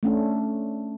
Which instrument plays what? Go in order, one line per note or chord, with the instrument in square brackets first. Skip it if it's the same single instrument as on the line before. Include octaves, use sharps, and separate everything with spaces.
[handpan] A3 C#4 D4